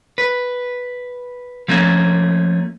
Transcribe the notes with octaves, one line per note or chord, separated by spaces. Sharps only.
B4
F3 A3 A#3 C#4